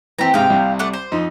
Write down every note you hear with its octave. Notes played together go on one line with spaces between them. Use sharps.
E3 C4 G4 A#5
G#2 C3 F5 G5
C2 C3
A3 D5 F#5
C5
F2 D#4